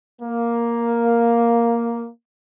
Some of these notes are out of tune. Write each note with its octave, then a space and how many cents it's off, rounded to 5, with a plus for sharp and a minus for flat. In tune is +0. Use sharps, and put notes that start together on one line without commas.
A#3 +5